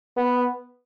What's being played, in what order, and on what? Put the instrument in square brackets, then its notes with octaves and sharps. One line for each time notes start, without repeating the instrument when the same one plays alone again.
[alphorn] B3